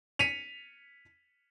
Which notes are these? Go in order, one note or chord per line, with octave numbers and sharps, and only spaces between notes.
B6 C#7 D#7 F7